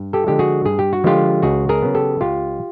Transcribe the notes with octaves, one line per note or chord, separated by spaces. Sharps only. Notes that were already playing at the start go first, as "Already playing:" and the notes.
Already playing: G2
G4 A4
D3 F3 G#3 G4
F#4 G#4
G2 G#4
G4
F#4
D3 F3 G#3 F4 G4
C#2 F#4 G#4
G#4 A#4
C#3 F#3 B3
G4 A4
C#2 F4 G4